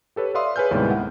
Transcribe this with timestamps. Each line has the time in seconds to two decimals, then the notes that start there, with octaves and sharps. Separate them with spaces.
0.16 G4 A4 B4 C#5
0.34 B4 D5 E5 F5 C6 D#6
0.56 G#4 B4 C#5 G#5 F6 G6
0.71 D#2 A2 C3 G3 G#3 B3
0.90 F#5